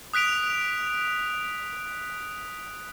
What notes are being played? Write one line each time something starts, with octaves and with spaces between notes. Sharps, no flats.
D#6 F#6 B6 D7 F7